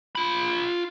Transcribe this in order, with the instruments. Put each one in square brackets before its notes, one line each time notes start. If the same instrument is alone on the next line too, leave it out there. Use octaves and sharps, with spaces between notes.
[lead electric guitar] F4 B5